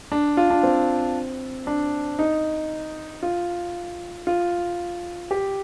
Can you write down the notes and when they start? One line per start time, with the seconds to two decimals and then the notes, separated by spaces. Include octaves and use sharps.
0.12 D4
0.37 F4
0.50 D4
0.63 C4
1.67 D4
2.19 D#4
3.23 F4
4.27 F4
5.31 G4